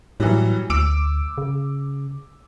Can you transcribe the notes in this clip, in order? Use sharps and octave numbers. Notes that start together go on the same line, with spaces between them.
A2 E3 F#3 G3
D2 D6 E6 D7
C#3